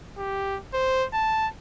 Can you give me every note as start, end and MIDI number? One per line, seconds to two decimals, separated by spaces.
0.17 0.58 67
0.73 1.05 72
1.13 1.47 81